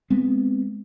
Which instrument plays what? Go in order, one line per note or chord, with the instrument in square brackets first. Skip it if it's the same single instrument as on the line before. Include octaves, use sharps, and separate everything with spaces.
[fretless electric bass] G#3 B3 C4